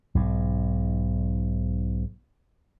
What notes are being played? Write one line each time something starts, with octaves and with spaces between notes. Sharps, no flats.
B1 G#2